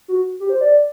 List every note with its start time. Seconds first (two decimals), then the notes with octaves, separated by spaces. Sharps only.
0.08 F#4
0.40 G4
0.49 C5
0.61 D5